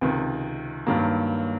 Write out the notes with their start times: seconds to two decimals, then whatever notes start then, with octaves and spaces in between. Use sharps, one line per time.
0.01 C#2 C3 D#3
0.87 G2 D#3 F#3 A#3